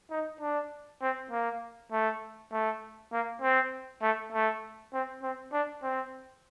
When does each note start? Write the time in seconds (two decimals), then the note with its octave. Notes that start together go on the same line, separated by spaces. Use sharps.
0.11 D#4
0.41 D4
1.02 C4
1.31 A#3
1.92 A3
2.52 A3
3.12 A#3
3.42 C4
4.02 A3
4.32 A3
4.94 C4
5.23 C4
5.53 D4
5.83 C4